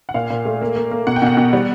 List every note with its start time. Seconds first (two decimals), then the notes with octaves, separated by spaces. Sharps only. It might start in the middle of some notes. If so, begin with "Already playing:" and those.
0.09 F#5
0.14 A#2 F5
0.30 A#2
0.45 A3
0.61 A#3
0.76 A#3
0.91 A#3
1.07 B2 F#5
1.16 G5
1.22 B2 F#5
1.37 B2
1.53 G3